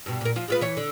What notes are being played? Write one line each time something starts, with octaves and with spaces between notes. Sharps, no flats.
G2 B2
A#2 A#4
F3 F4
G#3 F4 B4
E3 C#5
D3